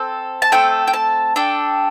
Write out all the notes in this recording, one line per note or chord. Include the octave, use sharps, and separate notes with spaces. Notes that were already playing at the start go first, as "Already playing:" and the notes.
Already playing: C4 A4
A5
A3 C4 A4 G5
G5
A5
D4 A4 G5